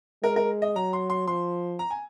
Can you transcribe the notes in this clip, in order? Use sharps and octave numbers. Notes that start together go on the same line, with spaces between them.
G#3 A#4
A#4
D#5
F#3 A#5
C6
C6
F3 C6
A#5
G#5